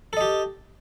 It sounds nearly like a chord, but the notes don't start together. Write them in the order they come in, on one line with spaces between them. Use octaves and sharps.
A4 D#5 G4